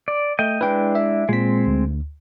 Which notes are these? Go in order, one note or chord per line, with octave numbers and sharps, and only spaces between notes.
D5
A3 D#5 G5
G#3 D4 E4 B4 G5
E5
A#2 G#3 C4 B6
D2